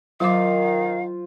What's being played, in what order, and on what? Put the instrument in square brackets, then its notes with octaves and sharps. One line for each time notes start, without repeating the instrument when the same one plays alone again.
[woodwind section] D#3 [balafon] F#3 D6 [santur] F4 C5 [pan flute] F5